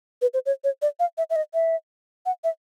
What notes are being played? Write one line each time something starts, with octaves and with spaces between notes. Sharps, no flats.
B4
C5
C#5
C#5
D5
F5
E5
E5
D#5
E5
F#5
E5